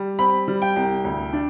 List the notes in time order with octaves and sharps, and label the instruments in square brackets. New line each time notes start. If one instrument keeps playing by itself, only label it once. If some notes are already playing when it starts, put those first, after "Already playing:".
Already playing: [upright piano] G3
C4 B5
G3
G5
C2
D2
D4